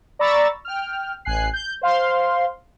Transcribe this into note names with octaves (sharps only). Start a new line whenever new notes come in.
D5 A#5 B5 C#6 E6 A6
G5 F6
A1 G#5 F#6 C7
G6
C5 F5 C6